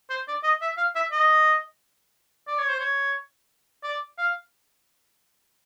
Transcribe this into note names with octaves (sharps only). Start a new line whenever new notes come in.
C5
D5
D#5
E5
F5
E5
D#5
D5
C#5
C5
C#5
D5
F5